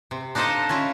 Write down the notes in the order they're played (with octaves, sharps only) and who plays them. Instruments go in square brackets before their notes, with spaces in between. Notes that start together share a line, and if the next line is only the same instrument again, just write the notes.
[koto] C3
D4 D#4 F4 A4 C5 D#5
C#4 E4 F4